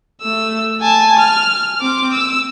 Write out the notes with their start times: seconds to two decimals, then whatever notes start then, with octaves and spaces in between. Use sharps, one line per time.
0.22 A3 E6
0.81 G#5 A5
1.19 F6
1.81 C4 D6
2.13 E6